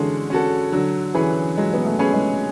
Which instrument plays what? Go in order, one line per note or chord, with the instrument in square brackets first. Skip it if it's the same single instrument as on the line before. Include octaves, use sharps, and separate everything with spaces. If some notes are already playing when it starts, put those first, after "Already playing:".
Already playing: [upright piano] D3 E3 [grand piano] G#3 C#4 F#4 A4
[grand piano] C#4 F#4 A4
[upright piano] D3 [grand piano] F#3
[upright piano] E3 [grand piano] C#4 G#4 B4
[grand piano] F#3 [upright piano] G#3
[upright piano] B3
A3
[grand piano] C#4 G#4 B4
[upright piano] G#3